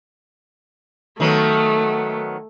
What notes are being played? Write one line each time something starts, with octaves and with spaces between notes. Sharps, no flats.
D#3 F#3 A3 B3